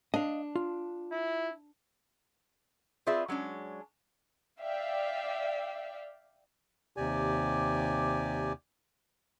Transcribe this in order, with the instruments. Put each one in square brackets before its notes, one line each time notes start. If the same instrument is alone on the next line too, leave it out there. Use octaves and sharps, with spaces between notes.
[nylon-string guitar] D4 [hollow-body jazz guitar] D#5 F5
[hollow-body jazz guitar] F4
[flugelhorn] E4
[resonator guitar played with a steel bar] C4 F4 G#4 B4 D5 E5
F#3 G#3 C#4 D4
[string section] D5 E5 F5 G5
[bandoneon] D#2 C3 G4 D5 G#5